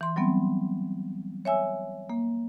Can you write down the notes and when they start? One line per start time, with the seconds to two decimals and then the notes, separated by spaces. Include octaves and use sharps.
0.01 E3 C6
0.16 F#3 G3 B3 C4
1.45 C#5 E5 G#5 E6
2.10 A#3